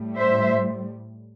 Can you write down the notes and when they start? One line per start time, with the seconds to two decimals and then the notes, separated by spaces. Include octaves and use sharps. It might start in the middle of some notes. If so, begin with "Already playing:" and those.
Already playing: A2 G3
0.17 C5 E5